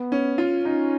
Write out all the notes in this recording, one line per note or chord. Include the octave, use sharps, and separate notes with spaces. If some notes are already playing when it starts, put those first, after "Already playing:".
Already playing: B3
C#4
F4
C#4 D#4